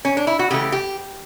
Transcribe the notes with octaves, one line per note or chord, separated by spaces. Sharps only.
C#4
D4
E4
F#4
C#3 E3 A3 G4
G4